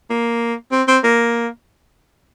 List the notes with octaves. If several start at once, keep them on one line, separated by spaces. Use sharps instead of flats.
A#3
C4
C4
A#3